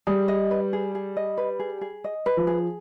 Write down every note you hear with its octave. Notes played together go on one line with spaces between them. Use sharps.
G3 G#4
D#5
B4
G#4
G#4
D#5
B4
G#4
G#4
D#5
B4
F3
G#4